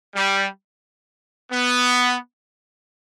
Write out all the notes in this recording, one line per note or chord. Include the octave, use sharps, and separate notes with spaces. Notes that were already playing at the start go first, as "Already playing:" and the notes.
G3
B3